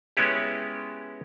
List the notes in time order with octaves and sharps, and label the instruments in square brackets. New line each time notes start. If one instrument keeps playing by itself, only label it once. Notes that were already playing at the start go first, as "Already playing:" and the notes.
[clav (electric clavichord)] G#3 B3 C#4 E4 G4